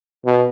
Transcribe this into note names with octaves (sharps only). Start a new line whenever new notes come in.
B2